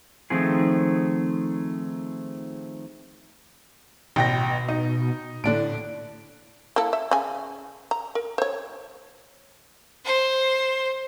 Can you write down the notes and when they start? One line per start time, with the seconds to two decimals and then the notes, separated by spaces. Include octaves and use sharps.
0.30 D#3 F3 A3 C4 D#4 G#4
4.16 A1 B2 G5 A#6
4.68 D#4
5.44 A2 D3 D4 D7
6.76 A#3 E4 A4
6.93 E5
7.11 C#3 G#5
7.91 A#5
8.15 A#4
8.38 C5 C#5
10.05 C5